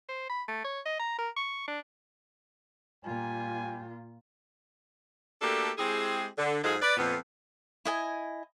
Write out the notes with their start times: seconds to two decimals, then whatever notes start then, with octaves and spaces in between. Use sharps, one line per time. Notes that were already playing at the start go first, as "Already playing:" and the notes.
0.09 C5
0.30 B5
0.48 A3
0.64 C#5
0.86 D#5
1.00 A#5
1.18 A#4
1.37 C#6
1.68 D4
3.04 A#2 G3 F4 G5 G#5
5.42 A3 A#3 D4 F#4 G4 A4
5.78 G#3 C4 E4 G4 G#4
6.38 D3
6.64 G#2 F#3 G#3 F4 G#4 A4
6.82 B4 D5
6.97 F2 A#2 B3
7.85 E4 D#5 G#5